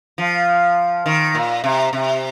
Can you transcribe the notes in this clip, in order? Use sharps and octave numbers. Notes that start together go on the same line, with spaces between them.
F3
D#3
A#2
C3
C3